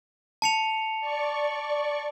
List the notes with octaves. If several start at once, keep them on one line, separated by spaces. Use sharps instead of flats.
A5 C#7 F7
D5 C#6